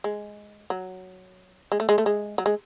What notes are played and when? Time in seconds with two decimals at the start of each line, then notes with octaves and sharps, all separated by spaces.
0.04 G#3
0.70 F#3
1.72 G#3
1.80 A3
1.89 G#3
1.98 A3
2.06 G#3
2.38 F#3
2.46 G#3